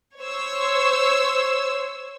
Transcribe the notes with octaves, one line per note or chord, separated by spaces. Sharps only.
C5 C#5 E6